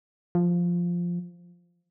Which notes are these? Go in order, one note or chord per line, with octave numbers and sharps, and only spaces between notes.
F3